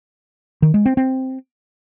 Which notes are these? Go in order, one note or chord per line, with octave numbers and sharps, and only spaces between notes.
D#3
G#3
C4
C4